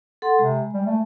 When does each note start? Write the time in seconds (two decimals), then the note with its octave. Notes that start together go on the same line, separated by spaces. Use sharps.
0.22 A4 F#5 C6
0.39 C3 G#3
0.74 G3
0.86 A3